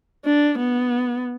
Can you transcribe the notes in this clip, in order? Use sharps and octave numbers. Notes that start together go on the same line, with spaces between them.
D4
B3